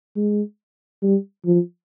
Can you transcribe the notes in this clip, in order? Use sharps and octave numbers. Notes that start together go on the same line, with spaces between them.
G#3
G3
F3